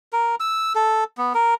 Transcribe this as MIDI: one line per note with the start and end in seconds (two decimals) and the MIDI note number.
0.13 0.35 70
0.40 0.73 88
0.75 1.04 69
1.18 1.33 59
1.35 1.54 70